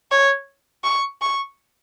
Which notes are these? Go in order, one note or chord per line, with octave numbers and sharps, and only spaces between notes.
C#5
C#6
C#6